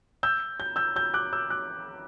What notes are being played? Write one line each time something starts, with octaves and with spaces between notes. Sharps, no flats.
E6 G6
G6
E6 G6
E6 G6
D6 F#6
E6 G6
D6 F#6